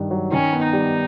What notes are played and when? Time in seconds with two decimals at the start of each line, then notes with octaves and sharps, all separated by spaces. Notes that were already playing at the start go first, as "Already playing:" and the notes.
Already playing: G2 D#3
0.11 F#3
0.32 D#3 C#4
0.53 B3
0.63 D#4
0.73 G3